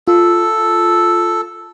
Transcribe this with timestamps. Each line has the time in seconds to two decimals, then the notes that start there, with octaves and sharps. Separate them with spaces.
0.08 F4 A4